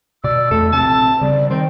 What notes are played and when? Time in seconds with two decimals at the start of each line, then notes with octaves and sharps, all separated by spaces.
0.24 B2 D5 E6
0.51 E2 B2 A3 A4
0.73 A#1 C3 C4 A5
1.21 C#3 G3 D5
1.50 D#3 C4 G5